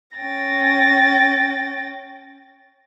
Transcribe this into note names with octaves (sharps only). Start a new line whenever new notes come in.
C#4 G5 A6 A#6